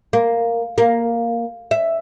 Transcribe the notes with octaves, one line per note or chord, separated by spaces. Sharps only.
A#3
A#3
E5